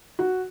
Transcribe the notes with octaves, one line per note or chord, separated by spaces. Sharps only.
F#4